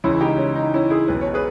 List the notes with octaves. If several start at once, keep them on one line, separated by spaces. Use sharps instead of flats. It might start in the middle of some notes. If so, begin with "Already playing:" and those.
C#2 C#3 E3 C#4 E4
D#4 G4
C#4
D#4
C#4 E4
E4 G#4
B1 B2 B4
C#5
G#4 B4